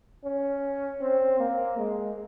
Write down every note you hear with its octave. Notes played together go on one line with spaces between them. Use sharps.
C#4
C4
A#3
G#3